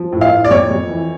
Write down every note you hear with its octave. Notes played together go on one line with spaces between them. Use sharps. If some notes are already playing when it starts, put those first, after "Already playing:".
Already playing: F3
A2
F5
A2
D5
F2 C#5
F2
E3